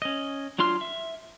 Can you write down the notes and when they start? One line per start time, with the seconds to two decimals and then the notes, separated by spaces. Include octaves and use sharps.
0.02 C#4 D#5
0.59 F#3 D4 F4 C6 F6
0.81 E5